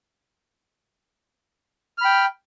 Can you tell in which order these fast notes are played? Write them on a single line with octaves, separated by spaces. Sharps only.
F6 B5 G5